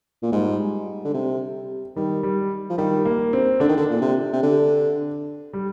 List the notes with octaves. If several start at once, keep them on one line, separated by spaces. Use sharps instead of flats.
A#2
G#2 G3
D3
C3
D#3 G3
G3
F3
D#3 G3
A#3
C4
D3 D4
D#3
D3
A#2
C3
C3
D3
G3